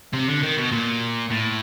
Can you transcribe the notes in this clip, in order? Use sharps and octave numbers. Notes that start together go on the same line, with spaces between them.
C3
D3
D#3
B2
A#2
A2